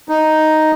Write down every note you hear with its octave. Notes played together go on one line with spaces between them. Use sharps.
D#4